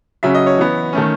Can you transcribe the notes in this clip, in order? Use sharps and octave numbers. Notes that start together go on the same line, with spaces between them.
C#3 F#3 C#4 E5
D#5
C#5
E3 B3
D#3 A3 C#4